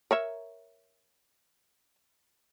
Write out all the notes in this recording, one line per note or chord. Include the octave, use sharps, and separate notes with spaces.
A#4 C#5 E5